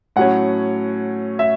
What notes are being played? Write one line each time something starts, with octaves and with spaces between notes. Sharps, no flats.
A2 F#3 C#4 F#5
E5